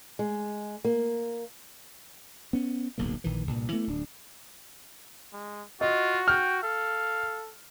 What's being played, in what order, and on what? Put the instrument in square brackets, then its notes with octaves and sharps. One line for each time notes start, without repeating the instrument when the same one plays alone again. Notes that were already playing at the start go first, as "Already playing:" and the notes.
[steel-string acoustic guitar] G#3
A#3
[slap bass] B3 C#4
D1 B1 G#2 A#3
A#1 D#3 E3
C2 G2 A#2
E3 A3 B3
D1 D4
[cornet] G#3
[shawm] F4 [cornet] F#4 [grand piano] D#5
[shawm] G5 [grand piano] F6
[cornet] A4 [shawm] F5